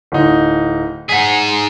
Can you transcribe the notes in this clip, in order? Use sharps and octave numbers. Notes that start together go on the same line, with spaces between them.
D1 D#4
D#4 G#4 F#5 B6